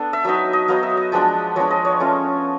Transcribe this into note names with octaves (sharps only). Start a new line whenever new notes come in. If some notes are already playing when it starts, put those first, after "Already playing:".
Already playing: B3 D4 A4
E5
F#3 B3 D#4 E5
D#5
F#3 B3 D#4 F5
E5
D#5
F3 G#3 B3 D4
F3 G#3 B3 D4 C#5
D#5
C#5
A3 C#4 F4